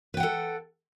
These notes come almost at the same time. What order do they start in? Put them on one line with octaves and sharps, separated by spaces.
B4 G5 F#5 A4